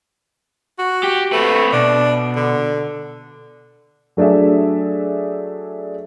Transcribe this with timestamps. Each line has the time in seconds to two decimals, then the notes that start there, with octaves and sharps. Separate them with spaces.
0.78 F#4
1.04 G4
1.32 A3 C4 B4
1.73 B2 D4
2.36 D3
4.17 F#3 A3 D4 G#4 E5